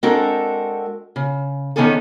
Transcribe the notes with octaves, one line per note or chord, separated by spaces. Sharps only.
G#3 C4 D4 F#4 A4 A#4
C#3
D3 D#3 B3 C#4 G#4 A4